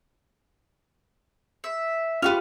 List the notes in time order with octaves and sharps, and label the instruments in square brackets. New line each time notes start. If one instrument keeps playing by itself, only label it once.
[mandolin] E5
[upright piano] F4 G4 [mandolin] B4 C#6 F6